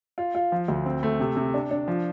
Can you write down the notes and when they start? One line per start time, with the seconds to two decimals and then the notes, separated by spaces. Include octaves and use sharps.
0.18 F4
0.35 F4
0.52 F3
0.68 D2
0.86 C4
1.03 A3
1.20 C3
1.37 C3
1.54 D4
1.71 D4
1.88 F3